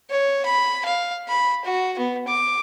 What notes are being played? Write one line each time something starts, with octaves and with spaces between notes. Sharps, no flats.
C#5
B5
F5
B5
F#4
B3
D6